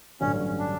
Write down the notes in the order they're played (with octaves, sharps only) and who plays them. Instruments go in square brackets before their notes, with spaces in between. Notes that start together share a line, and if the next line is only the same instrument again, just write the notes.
[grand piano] A1 G2 D3 F#3 [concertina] C#4
[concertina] D4